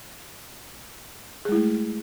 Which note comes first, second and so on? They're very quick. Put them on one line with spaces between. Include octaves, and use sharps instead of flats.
G#4 G#3 E4 A3